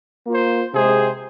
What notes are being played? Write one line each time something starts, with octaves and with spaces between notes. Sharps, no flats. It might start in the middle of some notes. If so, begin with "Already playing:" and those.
A#3 F4 C5
C3 G#3 C4 G#4 C5